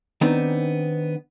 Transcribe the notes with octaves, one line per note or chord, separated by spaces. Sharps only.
D#3 B3 C4 D4 D#4